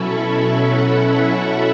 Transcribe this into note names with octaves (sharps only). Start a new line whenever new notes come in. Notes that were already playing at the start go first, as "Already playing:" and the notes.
Already playing: B2 F#3 C#4 E4 A4 B5 C#6
B5
F#5
E5